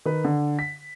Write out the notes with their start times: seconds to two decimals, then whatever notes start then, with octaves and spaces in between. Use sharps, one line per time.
0.06 D#3 B4
0.24 D3
0.59 B6